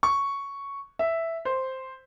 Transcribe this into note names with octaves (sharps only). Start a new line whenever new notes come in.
C#6
E5
C5